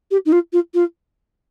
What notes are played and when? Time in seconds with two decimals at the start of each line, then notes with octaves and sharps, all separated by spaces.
0.11 G4
0.25 D#4
0.32 F4
0.53 F4
0.74 F4